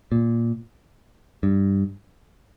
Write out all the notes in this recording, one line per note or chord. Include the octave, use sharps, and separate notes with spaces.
A#2
G2